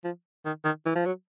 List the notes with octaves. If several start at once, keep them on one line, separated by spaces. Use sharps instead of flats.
F3
D#3
D#3
E3
F3
F#3